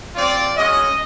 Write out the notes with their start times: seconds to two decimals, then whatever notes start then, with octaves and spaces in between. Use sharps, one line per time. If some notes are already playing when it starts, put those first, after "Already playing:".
0.14 C4 F4 D5
0.56 G#3 C#4 F#4 D#5